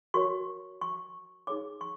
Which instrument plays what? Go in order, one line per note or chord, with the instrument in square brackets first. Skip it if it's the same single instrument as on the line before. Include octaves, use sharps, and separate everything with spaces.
[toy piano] F#4 A#4 C#5 C#6
C#6
D#4 G#4 C#5 D6
C#6